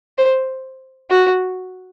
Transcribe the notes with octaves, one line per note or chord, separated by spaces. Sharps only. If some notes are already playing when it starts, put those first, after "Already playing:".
C5
F#4